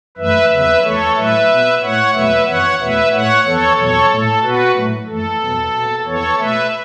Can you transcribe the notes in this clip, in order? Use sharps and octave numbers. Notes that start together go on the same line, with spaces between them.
F#2 E3 A3 B4 E5
E2 C#3 F#3 B3 B4 E5
E2 E3 A3 A4 C#5
A2 F#3 A3 B4 E5
B2 B3
A2 A3 C#5 F#5
E2 B2 F#3 A3 B4 E5
F#2 E3 B3 C#5 F#5
E2 B2 A3 B4 E5
A2 A3 C#5 F#5
E2 E3 B3 A4 C#5
E2 B2 F#3 B3 A4 C#5
A2 A3 A4
B2 B3 F#4 B4
A2 F#3 A3
F#2 E3 A3 A4
E2 B2 F#3 B3
B2 B3
E2 E3 B3 A4 C#5
B2 A3 B4 E5